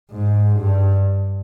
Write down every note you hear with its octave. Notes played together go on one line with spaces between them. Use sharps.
G#2
G2